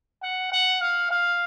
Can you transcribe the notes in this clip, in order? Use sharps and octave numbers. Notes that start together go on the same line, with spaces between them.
F#5
F#5
F5
F5